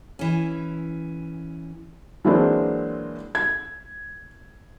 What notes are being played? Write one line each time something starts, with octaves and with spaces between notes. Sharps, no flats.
E3 C#4
E3 F#3 G#3 A#3 C4 D4
G#6